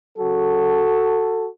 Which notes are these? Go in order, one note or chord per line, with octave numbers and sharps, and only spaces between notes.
C#3 F#3 F#4 A4